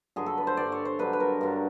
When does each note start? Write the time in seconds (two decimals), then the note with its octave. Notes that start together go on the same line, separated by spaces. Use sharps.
0.16 G2 D3 F#3 G#4
0.26 A4
0.38 B4
0.47 C5
0.57 G2 D3 F#3 D5
0.72 C#5
0.85 C5
0.99 G2 D3 F#3 B4
1.13 B4
1.20 A#4
1.41 G2 D3 F#3